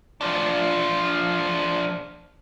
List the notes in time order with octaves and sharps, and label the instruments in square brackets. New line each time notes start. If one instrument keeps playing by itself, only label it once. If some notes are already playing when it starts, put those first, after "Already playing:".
[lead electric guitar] F3 D4